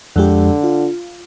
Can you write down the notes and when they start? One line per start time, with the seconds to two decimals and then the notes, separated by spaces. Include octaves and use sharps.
0.16 F2 D3 G#3 G4
0.64 F4